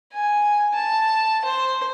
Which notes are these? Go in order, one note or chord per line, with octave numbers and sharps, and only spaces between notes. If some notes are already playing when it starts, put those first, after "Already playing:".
G#5
A5
C5